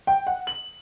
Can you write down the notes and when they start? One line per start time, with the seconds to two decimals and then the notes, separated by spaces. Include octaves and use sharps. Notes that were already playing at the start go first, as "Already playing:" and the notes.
0.07 G5
0.27 F#5
0.47 F#7